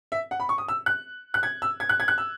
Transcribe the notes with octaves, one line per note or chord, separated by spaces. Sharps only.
E5
F#5
B5
C#6
D#6
E6
F#6
F#6
G#6
E6
G#6
F#6
G#6
F#6
E6